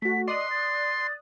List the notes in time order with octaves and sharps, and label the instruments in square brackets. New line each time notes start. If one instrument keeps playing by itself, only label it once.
[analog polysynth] A3 F#4 [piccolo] B6
[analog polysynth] D5 D#6 F#6 [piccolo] D#5 [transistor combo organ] C6
[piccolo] A6